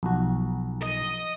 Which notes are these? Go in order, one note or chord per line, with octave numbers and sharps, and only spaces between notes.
B1 F3 F#4
D#5